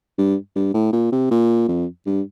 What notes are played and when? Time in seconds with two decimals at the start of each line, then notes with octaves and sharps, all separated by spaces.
0.18 G2
0.55 G2
0.74 A2
0.92 A#2
1.12 C3
1.31 A#2
1.68 F2
2.06 G2